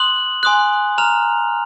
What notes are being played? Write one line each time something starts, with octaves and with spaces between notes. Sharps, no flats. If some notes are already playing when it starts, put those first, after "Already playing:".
Already playing: C6 D#6 F#6 F#7
G#5 C6 D#6 F#6
A#5 F6 F7